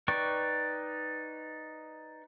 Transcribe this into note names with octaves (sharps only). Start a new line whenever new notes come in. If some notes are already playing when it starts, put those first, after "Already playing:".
D#4 B4 D5 G5 C#6